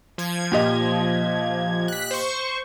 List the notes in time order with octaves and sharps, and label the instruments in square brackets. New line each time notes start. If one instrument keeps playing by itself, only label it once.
[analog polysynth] F3 G#6
[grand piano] A#2 G4 D#5
[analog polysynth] F#6 B6
C5 C#6